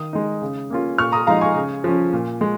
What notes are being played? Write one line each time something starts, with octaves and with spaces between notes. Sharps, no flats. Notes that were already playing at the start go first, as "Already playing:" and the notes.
Already playing: D#3 D#6
G#3 D#4
C#3
A#3 C#4 F4
A#2 C#6 F6
A#5 D#6
F3 G#3 D#4 F5 A#5
G#5 C#6
C#3
F3 C#4
A#2
G#3